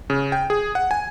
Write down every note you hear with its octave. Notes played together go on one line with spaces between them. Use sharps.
C#3
G5
G#4
F#5
G#5